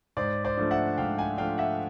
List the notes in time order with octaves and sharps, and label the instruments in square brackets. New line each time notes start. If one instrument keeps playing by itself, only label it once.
[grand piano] G#2 C5 D5
C5 D5
F3 A3 D4
E5 F#5
G#2 F5 G5
F#5 G#5
F3 A3 D4 F5 G5
E5 F#5